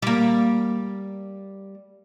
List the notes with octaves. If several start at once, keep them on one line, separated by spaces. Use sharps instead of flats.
G3 A#3